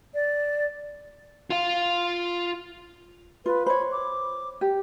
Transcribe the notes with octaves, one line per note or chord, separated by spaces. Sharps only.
D5
F4 F5
F4 B4
C5 C#5 B5
D6
G4